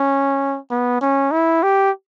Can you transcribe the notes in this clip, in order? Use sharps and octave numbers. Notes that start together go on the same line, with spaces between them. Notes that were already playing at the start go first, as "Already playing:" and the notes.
Already playing: C#4
B3
C#4
E4
G4